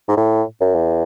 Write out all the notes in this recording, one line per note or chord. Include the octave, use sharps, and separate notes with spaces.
G#2
A2
F#2
E2